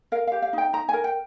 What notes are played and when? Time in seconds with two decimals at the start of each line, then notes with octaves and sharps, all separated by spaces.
0.12 A#4 F5
0.27 G4 F5
0.42 F5
0.53 D#4 G5
0.73 D#4 A#5
0.89 A#4 G#5
1.04 G5